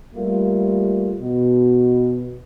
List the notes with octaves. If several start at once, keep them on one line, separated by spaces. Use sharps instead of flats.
G3 A3 A#3 F4
B2